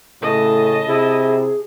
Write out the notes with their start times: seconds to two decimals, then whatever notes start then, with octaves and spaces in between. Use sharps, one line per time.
0.22 A2 C#3 D#5 A5
0.88 C3 E4 G#4